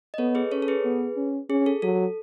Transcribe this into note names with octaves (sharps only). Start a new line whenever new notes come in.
D#5
B3 A4 C#5
G#4 B4
C#4 A4 C#5
A4
G#4 B4
B3
C#4
C#4 G#4
A4
F#3 A4